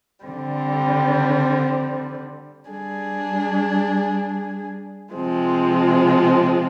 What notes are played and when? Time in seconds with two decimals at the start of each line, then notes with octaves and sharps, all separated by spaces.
0.25 D3 G3 C4
2.70 G3 D4 G#4
5.14 C3 F3 G#3 C4